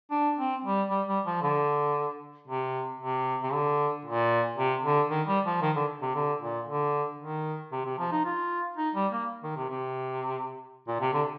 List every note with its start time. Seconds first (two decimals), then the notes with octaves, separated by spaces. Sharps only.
0.11 D4
0.37 C4
0.64 G3
0.90 G3
1.08 G3
1.26 F3
1.42 D3
2.48 C3
3.00 C3
3.43 C3
3.53 D3
4.05 A#2
4.57 C3
4.84 D3
5.10 D#3
5.28 G3
5.46 F3
5.62 D#3
5.76 D3
6.02 C3
6.15 D3
6.42 A#2
6.68 D3
7.19 D#3
7.72 C3
7.85 C3
7.98 F3
8.12 D#4
8.25 F4
8.77 D#4
8.95 G3
9.12 A#3
9.43 D#3
9.56 C3
9.70 C3
10.88 A#2
11.00 C3
11.13 D3